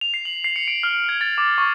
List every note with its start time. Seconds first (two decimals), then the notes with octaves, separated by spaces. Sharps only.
0.01 F7
0.14 C7
0.25 F#7
0.44 C7
0.56 C#7
0.68 D7
0.83 F6
1.09 G#6
1.21 A6
1.38 D6
1.58 C#6